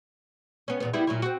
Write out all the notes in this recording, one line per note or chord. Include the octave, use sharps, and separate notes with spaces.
B3 C#4
E2 A#2 B3
G3 B3 E4
A#2 F#3 E4
C4 F#4